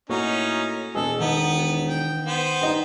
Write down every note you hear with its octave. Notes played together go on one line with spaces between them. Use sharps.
A2 A#3 C#4 D#4 F#4
E1 B2 G#3 G#4 A4
D#3 B3
G5
B3 C5
G2 D#4 D#5 G5